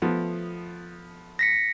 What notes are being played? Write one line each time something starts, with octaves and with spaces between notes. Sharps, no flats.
F3 A3 B3
A#6 B6 C#7